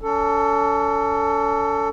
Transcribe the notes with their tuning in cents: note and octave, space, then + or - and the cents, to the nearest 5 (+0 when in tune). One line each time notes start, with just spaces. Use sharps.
C#4 +40 A4 +20